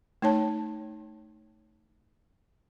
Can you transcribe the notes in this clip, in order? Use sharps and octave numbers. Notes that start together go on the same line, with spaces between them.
A3 D#4 C#5 A5